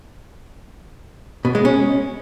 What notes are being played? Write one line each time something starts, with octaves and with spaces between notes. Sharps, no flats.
B2
G#3
C#4